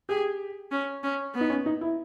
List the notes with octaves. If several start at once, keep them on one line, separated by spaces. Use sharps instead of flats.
G4 G#4
C#4
C#4
B3
D#4
C#4
D#4
E4